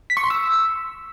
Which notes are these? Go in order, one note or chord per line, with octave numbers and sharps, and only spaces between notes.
B6
C#6
C6
E6